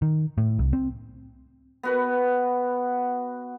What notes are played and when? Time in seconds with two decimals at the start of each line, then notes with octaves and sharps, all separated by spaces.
0.02 D#3
0.38 A2
0.59 C2
0.73 C4
1.83 B3 F#4 B4